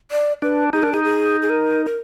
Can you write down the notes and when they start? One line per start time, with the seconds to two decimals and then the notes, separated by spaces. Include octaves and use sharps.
0.11 D5
0.42 D4 B4
0.73 D#4 G#4
0.82 D4 A#4
0.92 D#4 G#4
1.04 G#4
1.42 G#4
1.49 A#4
1.86 A#4